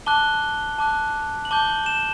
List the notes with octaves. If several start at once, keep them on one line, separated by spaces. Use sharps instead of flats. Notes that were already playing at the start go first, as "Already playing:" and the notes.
A5 D6 F#6 G7
A5 D6 F#6
F#7
A5 D6 G6 G7
E7